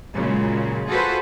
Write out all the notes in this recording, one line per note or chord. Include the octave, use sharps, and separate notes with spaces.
A#2 C#3 F#3 G#3
F4 F#4 G#4 A4 B4 C5